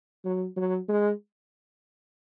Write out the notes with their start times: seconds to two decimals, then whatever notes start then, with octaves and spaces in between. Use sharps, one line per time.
0.25 F#3
0.56 F#3
0.88 G#3